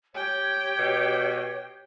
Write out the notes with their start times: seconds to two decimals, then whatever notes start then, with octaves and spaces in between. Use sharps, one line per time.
0.15 G4 C#5 G5
0.79 B2